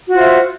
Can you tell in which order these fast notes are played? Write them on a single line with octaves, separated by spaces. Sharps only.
F#4 F4 C5 E5